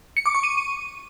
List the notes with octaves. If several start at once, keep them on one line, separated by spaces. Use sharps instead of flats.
C#7
D6
C#6
D#7